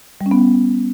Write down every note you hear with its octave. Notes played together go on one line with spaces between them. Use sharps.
G3
C#4
B3